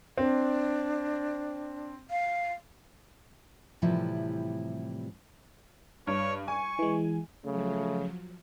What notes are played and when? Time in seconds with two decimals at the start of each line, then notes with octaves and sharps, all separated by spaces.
0.18 C4 D4
2.10 F5
3.82 A2 C3 E3 F3 G3 E4
6.07 G2 C#5
6.48 G#5 C#6
6.79 E3 G#3
7.45 C#3 F3 F#3 A3